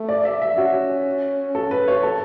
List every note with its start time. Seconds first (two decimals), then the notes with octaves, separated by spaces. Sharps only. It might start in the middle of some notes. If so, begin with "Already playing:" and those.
Already playing: A3
0.09 D5
0.25 E5
0.42 E5
0.57 C#4 F#4
1.55 A4
1.71 B4
1.88 C#5
2.03 A4